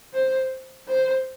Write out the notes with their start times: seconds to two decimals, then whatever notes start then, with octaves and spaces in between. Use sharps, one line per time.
0.13 C5
0.88 C5